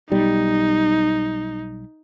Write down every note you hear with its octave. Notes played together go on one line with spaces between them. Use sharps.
B1 G3 D#4